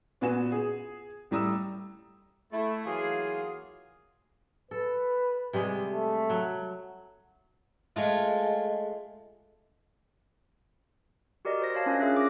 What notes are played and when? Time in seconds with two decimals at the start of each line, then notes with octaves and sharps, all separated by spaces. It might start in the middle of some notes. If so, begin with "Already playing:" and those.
0.21 A#2 B3 F#4 G#5 E7
0.52 G#4
1.31 A2 G3 A#5 D#6 E6
2.52 A3 E4
2.85 E3 F#3 A#3 F4 G#4
4.71 A4 B4
5.53 C3 G3 G#3
5.90 A3
6.30 F#3
7.96 G#3 A3 F4
11.45 F#4 G4 A#4 D5 D#5
11.62 C5 A#6
11.74 C#5 D5 F5 A5
11.86 C#4 D4 F4 A#4
12.00 C#4 F4 G#4 E5 F#6
12.16 D6 A#6